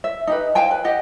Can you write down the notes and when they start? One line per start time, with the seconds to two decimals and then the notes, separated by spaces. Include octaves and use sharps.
0.04 E5
0.27 D#4 G4 B4
0.55 C5 F5 G5 G#5
0.71 B4
0.84 G4 D#5 F#5